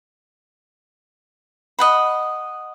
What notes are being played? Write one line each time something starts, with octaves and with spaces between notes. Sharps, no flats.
D#5 F#5 B5